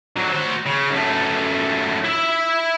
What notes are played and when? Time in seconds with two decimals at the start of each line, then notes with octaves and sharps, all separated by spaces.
0.16 D3 F#3
0.32 F#4 C5
0.66 C#3
0.90 F#2 A3
2.04 E4 E5